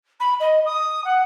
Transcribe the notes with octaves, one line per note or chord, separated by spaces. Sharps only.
B5
D#5
D#6
F#5